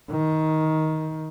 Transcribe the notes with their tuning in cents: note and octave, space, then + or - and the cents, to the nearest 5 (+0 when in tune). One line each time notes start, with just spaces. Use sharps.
D#3 +15